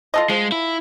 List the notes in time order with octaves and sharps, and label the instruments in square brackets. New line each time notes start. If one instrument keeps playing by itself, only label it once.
[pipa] F4 A4 D#5
[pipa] F3 [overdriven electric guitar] G#3
[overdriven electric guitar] E4